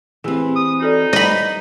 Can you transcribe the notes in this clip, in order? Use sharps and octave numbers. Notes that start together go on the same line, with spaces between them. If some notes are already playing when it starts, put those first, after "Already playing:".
E3 C4 G4 G#4
D#6
D#4 F#4 A4 D5
G3 D5 D#5 B5